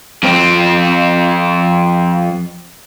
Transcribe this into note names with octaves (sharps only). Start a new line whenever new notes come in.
F2 C4